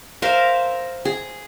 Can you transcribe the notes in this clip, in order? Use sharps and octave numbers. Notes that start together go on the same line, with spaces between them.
A#4 C5 E5 F5
G#4